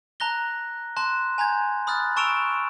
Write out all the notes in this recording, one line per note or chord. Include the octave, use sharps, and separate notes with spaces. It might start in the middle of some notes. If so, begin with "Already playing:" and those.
A5 A#5 F#6 A#6 G7
A5 C6 F#6
G#5 A#5 G6 G#6
B5 D#6 F6 F#6 A6
A5 C#6 E6 D7 E7 F7